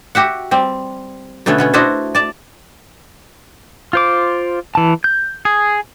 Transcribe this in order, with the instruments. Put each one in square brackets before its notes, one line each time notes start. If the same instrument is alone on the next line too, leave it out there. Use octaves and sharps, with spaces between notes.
[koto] F#4 G4 E5 F#5
G3 C4
B2 D3 A3 B3 C#4
B2 B3 C#4
D4 E4 F#4 C5 D#5
D5 A5
[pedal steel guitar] F4 C5 D6
E3 A5
G6
G#4